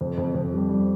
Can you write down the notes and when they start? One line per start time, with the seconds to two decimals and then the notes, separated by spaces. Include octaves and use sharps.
0.01 F2
0.18 F2
0.35 F2
0.52 G3
0.69 G3